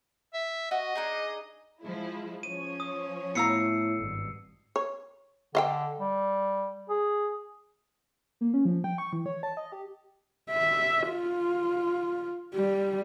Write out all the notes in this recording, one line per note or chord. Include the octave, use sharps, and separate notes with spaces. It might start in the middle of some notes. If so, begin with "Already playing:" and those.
E5
F#4 D#5
D4 D#4 G#4
F3 G#3 E4
F3 C#4 C#5 D#7
D#6
A2 B3 F5 A#5 E6 C7 C#7
G#1 G2
C#5
D3 D#5 F5 G5
G3
G#4
A#3
C#4
F3
G5
C#6
E3
C#5
A5
D#5
G4
E5
F4
G3